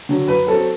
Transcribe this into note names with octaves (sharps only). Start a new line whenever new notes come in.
D3 F#3
F#2 B4
F#3 C4 A4